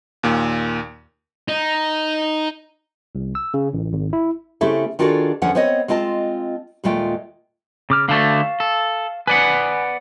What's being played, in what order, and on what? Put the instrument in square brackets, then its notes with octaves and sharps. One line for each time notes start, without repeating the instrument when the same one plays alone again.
[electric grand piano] D#2 A#2
[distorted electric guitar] D#4
[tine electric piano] C2
E6
C#3
A1
G#1
E4
[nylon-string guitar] C#3 A3 C4 E4 G4 A4
D#3 D4 F4 F#4 G#4 A4
E2 D3 F3 C#4 F#5
B3 C4 C5 C#5 D#5
G#3 C4 F4 D#5 A5
D#2 A#2 G#3 A3 F4 G5
[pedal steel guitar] C#3 D6 F6
[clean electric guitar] D3 A3 [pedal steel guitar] F5 A5 C#6
[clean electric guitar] A4
[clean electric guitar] B4 D5 F#5 [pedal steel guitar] G#5